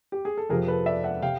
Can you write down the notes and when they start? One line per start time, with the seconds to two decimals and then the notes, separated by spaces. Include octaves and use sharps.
0.12 G4
0.25 G#4
0.38 A4
0.49 F2 C3 F3 G#4 A#4
0.68 A4 B4
0.86 D5 E5
1.04 E5 F#5
1.22 C3 F5 G5